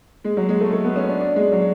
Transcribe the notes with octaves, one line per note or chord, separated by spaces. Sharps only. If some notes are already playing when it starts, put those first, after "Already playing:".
G#3
F#3
G#3
A3
A3
B3
C#4
D4
D4
G#3
F#3